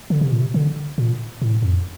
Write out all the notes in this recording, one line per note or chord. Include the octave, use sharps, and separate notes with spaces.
D3
C3
A#2
C3
D3
A#2
A2
F2